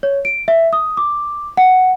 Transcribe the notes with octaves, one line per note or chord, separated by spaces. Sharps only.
C#5
D7
E5
D#6
D6
F#5